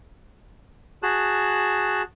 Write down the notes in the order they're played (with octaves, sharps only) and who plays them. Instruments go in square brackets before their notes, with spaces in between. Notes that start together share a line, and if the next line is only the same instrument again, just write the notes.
[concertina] F#4 G#4 A5 F#6